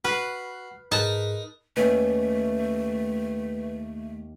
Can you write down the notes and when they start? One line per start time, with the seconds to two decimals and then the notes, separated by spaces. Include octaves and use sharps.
0.05 F#4 B4 F6 C7
0.92 G#2 D#4 G#4 A#4 B4 A5
1.77 D#2 A3 C#4 B4